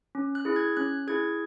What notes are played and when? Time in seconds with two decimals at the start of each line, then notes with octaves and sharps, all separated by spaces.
0.15 C#4
0.35 F#6
0.45 E4 G#4
0.56 G#6
0.77 C#4 F#6
1.08 E4 G#4 G#6